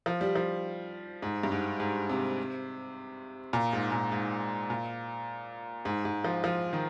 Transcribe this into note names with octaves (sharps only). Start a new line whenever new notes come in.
F3
G3
F3
G#2
G2
G#2
G#2
C3
A#2
G#2
A#2
G#2
A#2
G#2
G#2
F3
F3
D#3